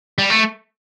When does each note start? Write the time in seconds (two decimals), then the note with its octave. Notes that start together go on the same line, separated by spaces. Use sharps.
0.18 G3
0.30 A3